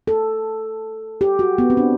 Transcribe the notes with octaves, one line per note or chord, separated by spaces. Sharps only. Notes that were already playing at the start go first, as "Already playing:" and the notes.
A4
G4
F#4
B3
C4
D4